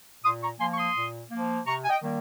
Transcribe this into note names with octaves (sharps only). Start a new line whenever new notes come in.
A#2 C6 D#6
A#5 C#6
F3 A#3 G#5 C6
C#6
C6 D#6
A#2
F3 A#3
C3 A#5 C#6
G#5
D#5 G5
D#3 G3 A#3